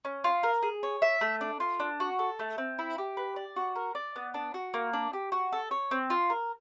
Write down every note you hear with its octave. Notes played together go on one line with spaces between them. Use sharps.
C#4
F4
A#4
G#4
C#5
E5
A3
D4
F4
D4
F#4
A4
A3
C4
E4
G4
B4
D5
F#4
A#4
D5
B3
D4
F#4
A#3
D4
G4
F#4
A4
C#5
C4
F4
A#4